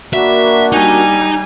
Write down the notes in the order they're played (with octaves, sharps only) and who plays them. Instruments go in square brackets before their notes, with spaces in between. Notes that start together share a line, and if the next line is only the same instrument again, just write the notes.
[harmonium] A#3 D4 F#4 [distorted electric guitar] E5 [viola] B5
[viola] G3 G#5 [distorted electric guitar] D#4